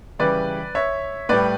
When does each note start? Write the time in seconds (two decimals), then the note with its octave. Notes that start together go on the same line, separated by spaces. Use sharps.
0.19 C#3 E3 G3 B4 D5
0.75 C#5 E5
1.29 A2 G3 B4 D5